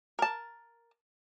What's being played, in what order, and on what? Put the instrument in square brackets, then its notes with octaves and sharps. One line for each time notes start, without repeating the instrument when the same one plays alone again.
[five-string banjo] A#4 A5